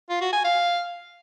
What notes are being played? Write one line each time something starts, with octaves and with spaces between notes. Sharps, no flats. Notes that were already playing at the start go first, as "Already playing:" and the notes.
F4
F#4
G#5
F5